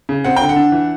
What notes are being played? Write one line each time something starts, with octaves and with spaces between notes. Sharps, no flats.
C#3
C4 F#5
D3 G5
F#5
D4
E3